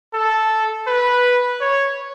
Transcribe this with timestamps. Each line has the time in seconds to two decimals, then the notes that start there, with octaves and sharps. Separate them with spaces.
0.14 A4
0.87 B4
1.61 C#5